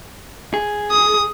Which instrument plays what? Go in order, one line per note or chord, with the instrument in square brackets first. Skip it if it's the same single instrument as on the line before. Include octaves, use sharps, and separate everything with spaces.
[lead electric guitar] G#4
[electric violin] D#6